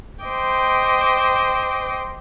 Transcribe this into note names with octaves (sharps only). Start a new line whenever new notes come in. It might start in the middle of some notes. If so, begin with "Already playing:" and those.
C5 D#5 G5 D6